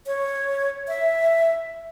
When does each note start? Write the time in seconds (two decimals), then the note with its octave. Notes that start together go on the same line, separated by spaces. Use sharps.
0.07 C#5
0.88 E5